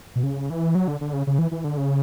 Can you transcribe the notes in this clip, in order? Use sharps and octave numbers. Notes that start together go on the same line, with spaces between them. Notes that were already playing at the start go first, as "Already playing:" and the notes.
B2
C#3
E3
F#3
D3
D3
C#3
C#3
E3
E3
D3
C#3